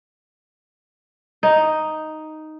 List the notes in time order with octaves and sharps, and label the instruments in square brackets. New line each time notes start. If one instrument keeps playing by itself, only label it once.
[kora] D#4